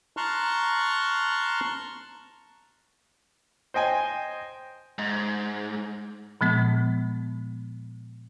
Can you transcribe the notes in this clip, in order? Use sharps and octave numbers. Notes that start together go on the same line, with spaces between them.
A5 A#5 C6 C#6 F6 F#6
C5 D#5 G5 G#5
G#2
A#2 F3 G#3 B3